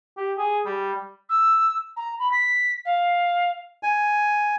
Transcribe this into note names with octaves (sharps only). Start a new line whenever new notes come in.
G4
G#4
G3
E6
A#5
B5
B6
F5
G#5